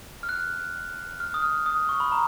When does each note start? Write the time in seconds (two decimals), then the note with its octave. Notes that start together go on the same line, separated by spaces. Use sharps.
0.23 F6
0.29 F#6
1.20 F6
1.34 D#6
1.42 F6
1.66 D#6
1.89 C#6
2.00 B5
2.12 A#5